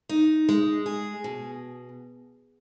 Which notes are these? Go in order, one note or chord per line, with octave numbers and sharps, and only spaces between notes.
D#4
G#3
G#4
B2